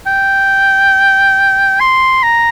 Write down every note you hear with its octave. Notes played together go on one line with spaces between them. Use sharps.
G5
C6
A#5